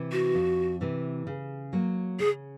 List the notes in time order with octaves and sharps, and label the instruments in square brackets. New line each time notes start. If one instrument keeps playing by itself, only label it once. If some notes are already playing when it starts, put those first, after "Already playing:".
Already playing: [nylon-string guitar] C3 E3
[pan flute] F#4
[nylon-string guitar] F2
C3 E3
C#3
F#3 A#3
[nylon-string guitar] C#3 [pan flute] G#4